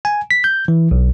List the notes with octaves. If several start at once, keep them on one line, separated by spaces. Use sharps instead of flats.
G#5
B6
G6
E3
B1